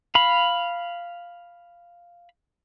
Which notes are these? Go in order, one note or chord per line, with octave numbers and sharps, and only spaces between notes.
F5 B5